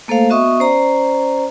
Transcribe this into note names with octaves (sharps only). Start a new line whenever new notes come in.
A3 A#3 A4 C5 F5
B3 F#4 D#5 E5 C#6 D#6
C#4 C5 D5 A#5